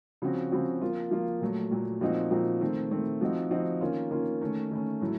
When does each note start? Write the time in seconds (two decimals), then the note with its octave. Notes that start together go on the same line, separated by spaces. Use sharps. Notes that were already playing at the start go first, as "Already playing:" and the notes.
0.22 C#3 F3 C4 F#4
0.51 C#3 F3 C4 F#4
0.81 F3 A#3 F4
1.11 F3 A#3 F4
1.41 A#2 F#3 A3
1.71 A#2 F#3 A3
2.01 A#2 F3 C4 D#4 F#4
2.31 A#2 F3 C4 D#4 F#4
2.61 D#3 A3 C4
2.91 D#3 A3 C4
3.21 F3 C4 D#4 F#4
3.51 F3 C4 D#4 F#4
3.81 D#3 A#3 C#4 F4
4.11 D#3 A#3 C#4 F4
4.41 D#3 A3 C#4
4.71 D#3 A3 C#4
5.01 A2 F#3 A3